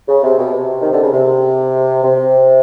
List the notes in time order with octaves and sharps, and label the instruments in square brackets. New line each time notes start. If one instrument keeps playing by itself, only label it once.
[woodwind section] C#3
C3
B2
C3
D#3
D3
C#3
C3
C3